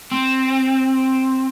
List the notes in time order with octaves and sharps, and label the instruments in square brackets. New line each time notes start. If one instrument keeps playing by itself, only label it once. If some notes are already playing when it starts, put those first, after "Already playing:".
[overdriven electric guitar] C4